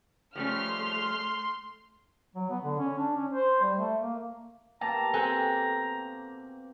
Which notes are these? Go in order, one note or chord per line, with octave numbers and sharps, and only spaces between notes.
F3 G3 A3 C#4 C6 F6
F#3
B3
D3
C#4
D4
C#4
C5
G3
A3
A#3
B2 A#3 G4 A5 A#5
C4 A4 G#5 F#6